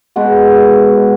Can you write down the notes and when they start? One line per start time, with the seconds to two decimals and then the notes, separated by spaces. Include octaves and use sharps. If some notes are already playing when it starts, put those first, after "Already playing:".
0.16 B2 G#3 B3 F#4